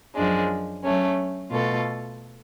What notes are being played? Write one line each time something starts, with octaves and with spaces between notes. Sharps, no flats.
F#2 F3 G#3 D4
F#3 A3 C#4
B2 A3 F4 A4